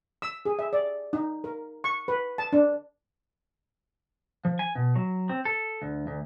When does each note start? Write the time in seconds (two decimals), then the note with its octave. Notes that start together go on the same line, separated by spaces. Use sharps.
0.22 E6
0.46 G#4
0.59 E5
0.73 D5
1.13 D#4
1.44 A#4
1.84 C#6
2.08 B4
2.38 A5
2.53 D4
4.45 F3
4.59 G#5
4.75 B2
4.96 F#3
5.29 C4
5.45 A4
5.82 D2
6.07 D2